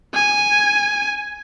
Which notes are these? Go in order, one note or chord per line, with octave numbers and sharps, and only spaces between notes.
G#5